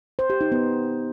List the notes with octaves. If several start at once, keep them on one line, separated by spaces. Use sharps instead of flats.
C5
G4
D#4
B3